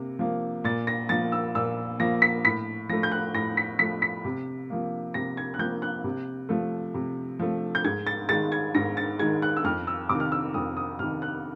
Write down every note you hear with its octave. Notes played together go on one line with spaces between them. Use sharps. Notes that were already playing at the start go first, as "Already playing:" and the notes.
Already playing: C3 A#3
F3 A#3
A#2 A6
A#6
F3 A#3 A6
E6
A#2 E6
F3 A#3 A#6
B6
A2 B6
F3 A3 A#6
G6
F#6
A2 A#6
B6
F3 A3 B6
B6
C3
F3 A#3
C3 A#6
G#6
F#6
F3 A#3 G6
F#6
C3
F3 A3
C3
F3 A3
G6
G#2 G#6
A6
D#3 G#3 A6
G#6
G#2 A#6
A6
D#3 G#3 G#6
F#6
E6
F2 F6
E6
C3 D#3 D6
F6
E6
F2 D#6
D#6
C3 D#3 F6
F#6